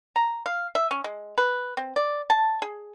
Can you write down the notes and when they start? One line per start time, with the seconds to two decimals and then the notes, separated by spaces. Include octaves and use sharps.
0.16 A#5
0.46 F5
0.75 E5
0.91 C#4
1.04 G#3
1.38 B4
1.77 C4
1.96 D5
2.30 A5
2.62 G#4